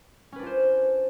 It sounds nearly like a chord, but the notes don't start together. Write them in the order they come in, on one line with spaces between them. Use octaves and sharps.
C#4 B4 D4 F4 C5